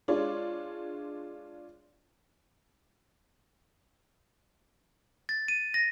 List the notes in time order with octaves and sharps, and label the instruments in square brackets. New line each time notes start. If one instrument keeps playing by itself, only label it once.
[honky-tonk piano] G#3 D4 F4 C#5 D5
[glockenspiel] A6
D#7
A#6